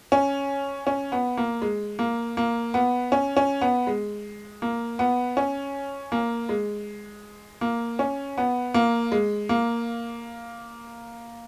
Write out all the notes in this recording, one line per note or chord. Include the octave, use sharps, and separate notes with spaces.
C#4
C#4
B3
A#3
G#3
A#3
A#3
B3
C#4
C#4
B3
G#3
A#3
B3
C#4
A#3
G#3
A#3
C#4
B3
A#3
G#3
A#3